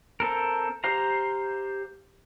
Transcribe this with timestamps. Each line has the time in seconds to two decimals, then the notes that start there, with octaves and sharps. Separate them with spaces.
0.20 C4 A4 A#4
0.84 G4 C5 F5 A#5